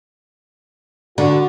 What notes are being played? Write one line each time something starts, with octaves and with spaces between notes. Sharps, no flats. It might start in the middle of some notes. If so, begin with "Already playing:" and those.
D3 F#4